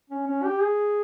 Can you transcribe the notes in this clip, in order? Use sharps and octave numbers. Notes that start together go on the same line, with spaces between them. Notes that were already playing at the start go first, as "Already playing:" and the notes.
C#4
C#4
G4
G#4